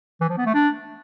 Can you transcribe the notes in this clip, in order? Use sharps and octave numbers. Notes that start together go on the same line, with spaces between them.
E3
F3
B3
A3
D4